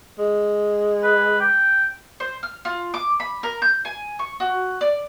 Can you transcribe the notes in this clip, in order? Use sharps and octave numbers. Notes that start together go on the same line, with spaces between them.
G#3
B4
G5
C5
F6
F4
D6
B5
A#4
G6
G#5
C#6
F#4
D5